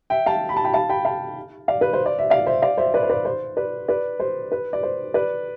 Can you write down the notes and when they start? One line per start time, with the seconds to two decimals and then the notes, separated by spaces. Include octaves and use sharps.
0.10 E5 G5
0.26 F5 A5
0.49 B5
0.56 A5
0.64 G5 B5
0.74 F5 A5
0.89 G5 B5
1.05 F5 A5
1.68 D5 F5
1.81 B4
1.93 C5
2.06 D5
2.19 E5
2.30 D5 F5
2.46 C5 E5
2.62 D5 F5
2.78 C5 E5
2.94 B4 D5
3.03 C5
3.10 B4 D5
3.25 C5
3.57 B4 D5
3.88 B4 D5
4.20 C5
4.52 B4
4.73 D5
4.83 C5
5.14 B4 D5